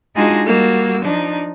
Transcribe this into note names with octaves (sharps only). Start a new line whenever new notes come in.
G#3 D4 D#4 F4 F#4 G#4
G3 A#3 F#4 E6
F3 D4 D#4